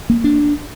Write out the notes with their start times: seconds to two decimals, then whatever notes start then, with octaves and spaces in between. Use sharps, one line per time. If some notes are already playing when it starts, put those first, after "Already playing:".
0.10 A#3
0.24 D4